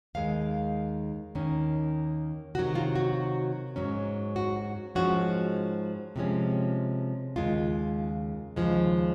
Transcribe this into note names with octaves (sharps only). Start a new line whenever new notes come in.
D#2 D#3 G#3 F5
D#2 D#3 A#3 C#4
C3 D#3 F#3 F#4
F4
F#4
G#2 F#3 C#4
F#4
G#2 F3 G#3 C#4 F#4
C3 F3 G#3 C#4
D#2 C#3 G#3 F4
D#2 C#3 F3 G#3